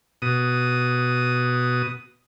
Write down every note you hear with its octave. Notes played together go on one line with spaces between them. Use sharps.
B2 D#6